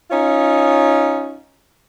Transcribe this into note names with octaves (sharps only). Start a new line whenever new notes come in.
C#4 D#4 F4 C#5